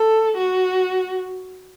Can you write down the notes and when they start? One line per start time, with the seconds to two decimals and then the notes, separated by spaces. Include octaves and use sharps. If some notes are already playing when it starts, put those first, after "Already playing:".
Already playing: A4
0.37 F#4